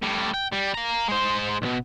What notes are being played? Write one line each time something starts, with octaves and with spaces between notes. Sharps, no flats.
A2 G3
G5
G3
F5 A#5
G#3 C5
B1 B2